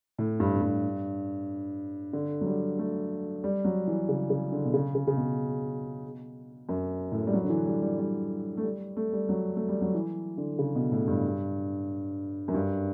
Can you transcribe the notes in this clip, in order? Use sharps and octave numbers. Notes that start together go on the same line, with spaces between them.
A2
G2
A2
G2
D3
F#3
G3
A3
G3
F#3
E3
C#3
C#3
D3
B2
C#3
C#3
C#3
B2
F#2
A2
G3
F#3
D3
E3
G3
G3
G3
A3
G3
A3
G3
F#3
A3
G3
F#3
E3
D3
C#3
B2
A2
G2
F#2
G2